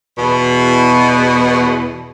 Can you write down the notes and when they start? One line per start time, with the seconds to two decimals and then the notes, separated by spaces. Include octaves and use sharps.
0.18 E2 B2